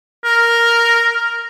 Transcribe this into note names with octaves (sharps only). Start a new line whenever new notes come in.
A#4